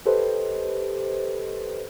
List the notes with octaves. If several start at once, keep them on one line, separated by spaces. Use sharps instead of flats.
G4 A4 B4 C5 D#5